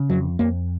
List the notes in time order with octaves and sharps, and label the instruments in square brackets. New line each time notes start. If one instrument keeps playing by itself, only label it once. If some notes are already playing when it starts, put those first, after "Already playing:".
Already playing: [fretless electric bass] C#3
F2 F#3
F2 A#3